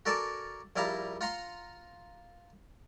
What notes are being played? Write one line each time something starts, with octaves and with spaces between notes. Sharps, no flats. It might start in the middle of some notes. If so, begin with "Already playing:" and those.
F#4 A4 A#4 D5 G#5 A5
A#1 G3 E4 F5 A5 A#5
F4 F#5 A#5 C6